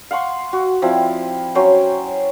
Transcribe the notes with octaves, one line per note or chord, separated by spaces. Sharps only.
F5 F#5 C6 C#6
F#4
F3 C4 E4 D5
F#3 C#4 C5 G5